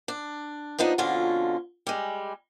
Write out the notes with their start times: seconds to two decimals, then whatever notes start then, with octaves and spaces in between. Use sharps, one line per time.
0.08 D4
0.78 F3 B3 D4 D#4
0.98 F2 B2 D3 C#4 F4
1.87 G3 G#3